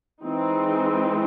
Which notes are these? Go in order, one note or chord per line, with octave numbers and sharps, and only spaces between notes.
E3 G#3 C4 D#4